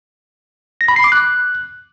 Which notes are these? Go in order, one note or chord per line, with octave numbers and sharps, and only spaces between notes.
A#6
B5
C7
D6
F#6